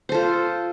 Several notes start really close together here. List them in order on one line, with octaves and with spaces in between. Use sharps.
C5 A4 F4